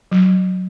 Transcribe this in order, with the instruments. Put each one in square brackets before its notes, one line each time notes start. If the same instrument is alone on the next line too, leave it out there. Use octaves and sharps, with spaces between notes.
[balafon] F#3